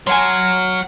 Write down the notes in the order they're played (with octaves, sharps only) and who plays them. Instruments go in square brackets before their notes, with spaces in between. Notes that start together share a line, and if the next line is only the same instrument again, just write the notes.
[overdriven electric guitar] F#3 [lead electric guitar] C#5 F#5 [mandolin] G#5 C6 [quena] F6